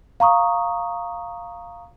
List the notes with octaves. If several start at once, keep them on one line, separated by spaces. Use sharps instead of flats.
F5 A#5 C#6 D#6